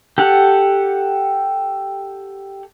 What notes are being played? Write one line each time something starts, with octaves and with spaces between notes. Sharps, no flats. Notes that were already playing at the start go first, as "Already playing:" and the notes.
G4 A4 F#5